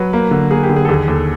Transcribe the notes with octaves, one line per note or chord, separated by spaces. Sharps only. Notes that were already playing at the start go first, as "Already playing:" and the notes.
Already playing: F#3 B4
A#3
D3
A#3 G#4
G4
D3
G#4
A4
D#2 G#4
D#2 A4